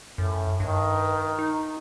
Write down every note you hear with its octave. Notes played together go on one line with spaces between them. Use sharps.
F#2 A2
G2 D#3
D#4